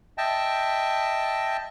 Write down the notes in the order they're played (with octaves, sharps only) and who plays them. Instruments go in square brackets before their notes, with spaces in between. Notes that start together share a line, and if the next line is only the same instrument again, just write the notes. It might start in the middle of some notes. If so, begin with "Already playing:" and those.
[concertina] D#5 E5 G5 A5